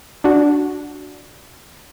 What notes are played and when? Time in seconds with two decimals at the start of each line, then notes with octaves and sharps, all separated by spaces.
0.24 D4 F#4